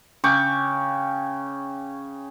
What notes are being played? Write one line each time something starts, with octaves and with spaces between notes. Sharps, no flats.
C#3 G5 C#6 D6